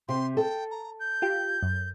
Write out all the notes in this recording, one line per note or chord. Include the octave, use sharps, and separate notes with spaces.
C3 G4 C6
A4 G5
A#5
G6
F4 G4
F#2